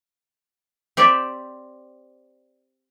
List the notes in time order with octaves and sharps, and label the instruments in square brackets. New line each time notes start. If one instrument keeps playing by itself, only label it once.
[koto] C4 G4 D5 E5